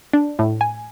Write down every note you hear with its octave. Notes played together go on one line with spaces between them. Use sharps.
D4
A2
G#5